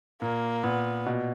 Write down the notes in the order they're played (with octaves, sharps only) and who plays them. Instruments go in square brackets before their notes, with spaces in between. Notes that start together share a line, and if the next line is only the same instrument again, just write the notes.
[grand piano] A#2 [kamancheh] A#3
[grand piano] A#2 [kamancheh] B3
[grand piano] B2